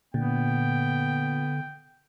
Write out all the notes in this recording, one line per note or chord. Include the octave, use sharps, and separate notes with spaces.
A#2 D3 B3 G5